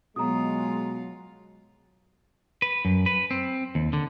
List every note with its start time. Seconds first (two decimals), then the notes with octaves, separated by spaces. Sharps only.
0.16 B2 F#3 G#3 F4 A#5 D#6
2.62 B4
2.85 F#2
3.06 B4
3.31 C4
3.75 D#2
3.93 D3